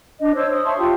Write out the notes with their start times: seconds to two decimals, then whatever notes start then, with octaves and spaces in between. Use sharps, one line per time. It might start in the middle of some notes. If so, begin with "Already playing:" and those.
0.19 D4 D#5
0.35 C5 C#5 E6
0.51 D#6
0.65 E5 A5 C6 C#6
0.78 F4 G4